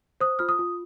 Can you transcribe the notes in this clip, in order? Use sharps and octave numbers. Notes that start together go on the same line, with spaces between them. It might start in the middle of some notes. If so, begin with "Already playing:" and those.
C5 D#6
F4 F6
D#6
F4